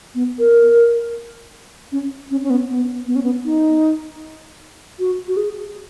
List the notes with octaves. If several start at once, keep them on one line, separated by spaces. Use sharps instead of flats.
B3
A#4
C#4
C#4
C#4
B3
B3
B3
C#4
B3
D#4
F#4
F#4
G#4